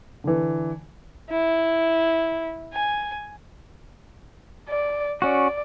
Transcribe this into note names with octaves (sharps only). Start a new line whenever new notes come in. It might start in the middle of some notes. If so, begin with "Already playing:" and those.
D3 E3
E4
G#5
D5
C#4 F#4 D5